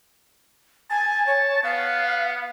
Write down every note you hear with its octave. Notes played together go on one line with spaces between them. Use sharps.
G#5 A5
C#5
B3 F5